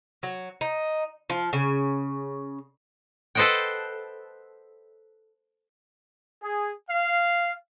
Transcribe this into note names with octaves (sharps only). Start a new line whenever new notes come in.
F#3
D#4
F3
C#3
A4 B4 C5 D#5 F#5 G5
G#4
F5